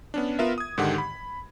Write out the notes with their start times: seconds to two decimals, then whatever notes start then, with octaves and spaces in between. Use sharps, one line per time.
0.14 B3 C#4 D4
0.39 B3 F4 A#4 E5
0.58 D#6 G#6
0.78 G#2 D3 D#3 G4 F#5
0.98 B5